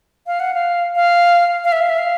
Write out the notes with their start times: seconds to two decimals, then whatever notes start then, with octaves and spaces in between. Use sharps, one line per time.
0.27 F5
0.40 F#5
0.54 F5
0.96 F5
1.64 F5
1.72 E5
1.81 F5
1.89 E5
1.98 F5